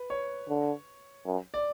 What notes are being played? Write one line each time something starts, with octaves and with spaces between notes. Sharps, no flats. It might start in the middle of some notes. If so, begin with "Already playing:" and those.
Already playing: B4
C#5
D3
F#2
D5